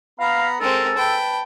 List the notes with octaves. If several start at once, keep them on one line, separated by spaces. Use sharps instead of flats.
B3 F5 A#5 B5
G#3 C4 A4 A#4
B4 G5 A5